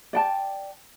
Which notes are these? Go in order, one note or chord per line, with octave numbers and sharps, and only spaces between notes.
D5 G5 A5